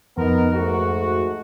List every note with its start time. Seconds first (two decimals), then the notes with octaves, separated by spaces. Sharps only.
0.17 F2 B3 D#4 A#4
0.54 G#2 A3 F#4